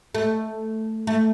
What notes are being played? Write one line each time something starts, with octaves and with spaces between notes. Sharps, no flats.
A3
A3